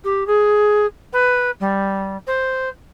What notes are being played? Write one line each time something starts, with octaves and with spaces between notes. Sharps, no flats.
G4
G#4
B4
G3
C5